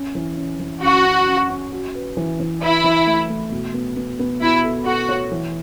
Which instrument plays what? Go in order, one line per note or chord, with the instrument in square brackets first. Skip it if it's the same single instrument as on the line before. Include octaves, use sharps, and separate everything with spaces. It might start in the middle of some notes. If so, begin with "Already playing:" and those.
Already playing: [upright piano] C#4
E3
C#4
E3
[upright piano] F#2 [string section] F#4
[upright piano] F#2
F#2
C#4
F#4
B4
E3
E3
[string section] E4 [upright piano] B4
[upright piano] E3
A3
A3
B2
B3
B3
B3
[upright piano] B2 [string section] E4
[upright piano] A4
[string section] F#4 [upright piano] A4
[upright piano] C#5
E3